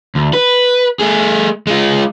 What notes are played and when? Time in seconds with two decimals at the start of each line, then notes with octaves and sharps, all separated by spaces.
0.15 D2
0.33 B4
0.99 A3 G#4
1.67 G#3 F4